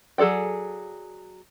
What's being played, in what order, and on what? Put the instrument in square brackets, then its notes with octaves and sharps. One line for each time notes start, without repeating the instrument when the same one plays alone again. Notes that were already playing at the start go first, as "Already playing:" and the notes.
[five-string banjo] F#3 G#4 A4 D5 G5